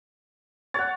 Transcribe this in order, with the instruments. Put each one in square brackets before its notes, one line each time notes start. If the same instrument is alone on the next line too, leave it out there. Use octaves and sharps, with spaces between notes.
[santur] C#5 F#5 [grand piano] A6